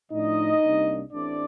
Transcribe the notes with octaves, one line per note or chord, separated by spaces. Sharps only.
A2 F3 A3 D4 D#4 D#5
C2 C3 G3 A#3 D4
A1 A2 A3 C4 D4 D5